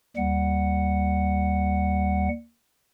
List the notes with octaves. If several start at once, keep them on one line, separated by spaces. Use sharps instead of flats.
D#2 G3 F#5